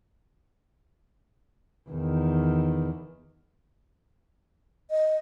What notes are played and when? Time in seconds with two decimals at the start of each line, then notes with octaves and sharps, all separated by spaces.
1.89 E2 D#3
4.91 D#5